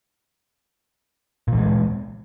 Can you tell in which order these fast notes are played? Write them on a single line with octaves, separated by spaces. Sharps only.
A#2 E3 G#3